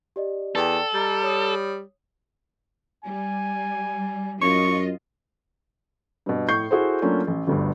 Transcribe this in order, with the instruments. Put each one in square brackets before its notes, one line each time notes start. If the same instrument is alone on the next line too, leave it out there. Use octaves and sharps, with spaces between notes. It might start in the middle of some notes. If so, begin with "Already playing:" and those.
[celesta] G4 D5 D#5
[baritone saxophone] E2 [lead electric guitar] A4 [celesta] D5 G5
[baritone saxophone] G3 [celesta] D#5 A#5 A6
[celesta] C#5 D#6
[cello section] G3 [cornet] G#5
[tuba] F#2 [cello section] F4 D#5 [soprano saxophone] C#6
[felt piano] G2 B2
A2 C#6 G6 C7
E4 F#4 G#4 A4 C5
F#3 A3 A#3 C#4 D4 F4
A1
G1 D2 G2